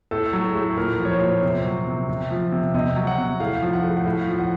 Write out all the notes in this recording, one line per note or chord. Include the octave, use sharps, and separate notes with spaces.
A2 A4
F#3
A4
A2
A#2 A#4
F3
C#5
C5
A#2
C3 C5
F#3
C3
C3
F3
C3
C3 D#5
F#3
F#5
C3
A2 F5
F3
F#5
A2
F#5
A2 F5
F3
F#5